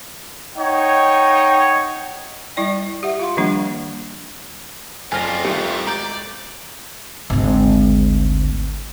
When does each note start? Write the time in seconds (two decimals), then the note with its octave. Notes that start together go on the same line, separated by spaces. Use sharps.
0.57 D#4 C#5 D#5 F#5 G5
2.57 G3 E4 D5 G5
3.03 G4 E5 F#5
3.20 F4 F5 C6
3.37 D#3 F3 G3 A#3 D4
5.12 F#1 F2 G3 F4 G#5 F6 A#6
5.45 C2 D#3 G4
5.87 G#1 D5 A#5 G6
7.30 G#1 D2